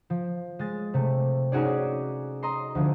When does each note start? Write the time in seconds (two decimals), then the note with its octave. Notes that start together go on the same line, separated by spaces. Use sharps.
0.10 F3
0.59 G#3 A6
0.94 C3 A3
1.52 C#4 D#4 F#4 G#4 D5
2.43 D#5 A#5 C6
2.75 D2 F3